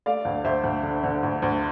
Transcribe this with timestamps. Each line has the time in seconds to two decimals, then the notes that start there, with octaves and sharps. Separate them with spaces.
0.06 A3 D5 F5
0.25 D2
0.44 D2 C5 E5
0.64 D2
0.83 D3
1.03 D3
1.23 D2
1.42 D2